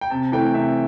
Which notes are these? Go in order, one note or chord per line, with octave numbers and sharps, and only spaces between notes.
G5
C3 A5
E3 A3 G5
C3 E5